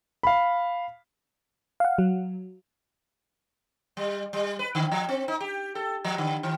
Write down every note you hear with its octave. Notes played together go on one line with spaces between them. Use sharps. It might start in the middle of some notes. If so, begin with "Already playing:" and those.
F5 B5
F5 F#5
F#3
G3
G3
B4
D3
F3
C4
D#4
G4
A4
F3
D3
D#3